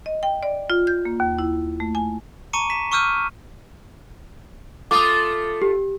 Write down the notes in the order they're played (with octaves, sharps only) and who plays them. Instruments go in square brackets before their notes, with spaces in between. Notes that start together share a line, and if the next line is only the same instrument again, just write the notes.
[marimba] D#5
G5
D5
F4
G6
A#3
D#2
E4
A3
G#5
[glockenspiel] A5 A#5 C#6 D6 C#7 D#7
B6 E7
C#6 D6 E6 F6 G6 D#7
[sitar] A3 F4 [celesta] D6 D#6
[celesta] G4